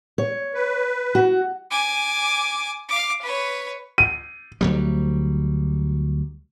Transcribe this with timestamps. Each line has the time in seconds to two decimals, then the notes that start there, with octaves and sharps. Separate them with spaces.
0.18 C#5
0.54 B4
1.15 F#4
1.70 G#5 D6
2.88 F5 D6
3.21 B4 C#5
3.98 D#7
4.61 D2 F#3 G3